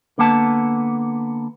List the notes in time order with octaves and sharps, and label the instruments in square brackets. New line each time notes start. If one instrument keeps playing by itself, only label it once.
[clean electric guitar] D3 A#3 B3 A5